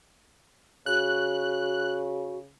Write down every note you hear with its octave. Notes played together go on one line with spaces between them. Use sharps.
C#3 F#4 F#6